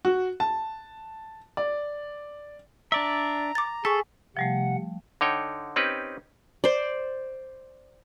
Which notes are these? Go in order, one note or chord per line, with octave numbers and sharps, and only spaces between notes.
F#4
A5
D5
D4 D5 E5 A#5
D6 A6
G#4 A4 G#5 C#6 B6
C3 F3 G3 A3 F#5
D3 D#4 C#5 G5
C4 C#4 D#4 G4 B4
C5 D5